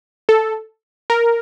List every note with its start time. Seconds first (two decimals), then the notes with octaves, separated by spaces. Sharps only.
0.29 A4
1.10 A#4